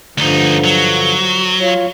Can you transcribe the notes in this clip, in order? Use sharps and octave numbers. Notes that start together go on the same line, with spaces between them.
D2 G2 D3 F3 D#4
F#3
F4 C#5